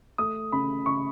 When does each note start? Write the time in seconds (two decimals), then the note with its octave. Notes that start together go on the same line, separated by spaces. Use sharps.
0.18 A3 D#6
0.52 C#3 B5
0.86 C#3 C#6